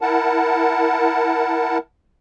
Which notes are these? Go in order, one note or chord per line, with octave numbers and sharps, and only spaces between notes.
E4 A#4 F#5 A5